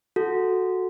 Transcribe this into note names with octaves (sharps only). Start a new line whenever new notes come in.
F#4 A4